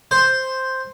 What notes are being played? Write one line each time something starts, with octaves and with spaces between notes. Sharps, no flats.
C5